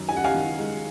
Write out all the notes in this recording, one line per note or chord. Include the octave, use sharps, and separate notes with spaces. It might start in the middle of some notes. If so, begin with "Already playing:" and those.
Already playing: F#2 D#3
D#4 G#5
F#5
F5 G#5
D#3
G#3